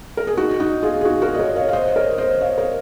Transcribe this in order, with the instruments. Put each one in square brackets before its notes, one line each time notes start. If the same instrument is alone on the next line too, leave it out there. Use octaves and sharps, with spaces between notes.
[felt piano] A#4
G#4
D#4 F#4
D#4 F#4
F4 G#4
G#4
D#4 F#4
F#4 A#4
D#5
A#4 C#5
C#5 F5
F5
C5 D#5
A#4 C#5
C5 D#5
C#5 F5
A#4 C#5